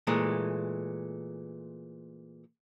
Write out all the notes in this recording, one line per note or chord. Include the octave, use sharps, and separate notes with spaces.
A#2 E3 G#3 A3